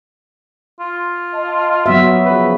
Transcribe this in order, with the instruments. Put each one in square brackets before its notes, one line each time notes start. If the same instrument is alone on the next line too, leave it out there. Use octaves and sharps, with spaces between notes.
[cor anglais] F4
[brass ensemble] D#5 A5
[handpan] F#3 B3 E5 [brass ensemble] F#4
[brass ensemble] C#3 F3 [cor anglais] B4